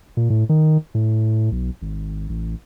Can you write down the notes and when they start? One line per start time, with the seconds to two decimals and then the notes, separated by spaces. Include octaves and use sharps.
0.17 A#2
0.30 A2
0.49 D#3
0.95 A2
1.51 B1
1.82 G#1
2.29 A1